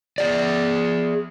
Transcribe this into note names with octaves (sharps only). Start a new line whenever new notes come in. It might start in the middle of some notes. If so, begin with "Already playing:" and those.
G#4 D5